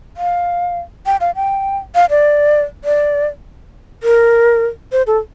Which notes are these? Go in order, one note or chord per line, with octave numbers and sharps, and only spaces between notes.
F5
G5
F5
G5
F5
D5
D5
A#4
C5
A4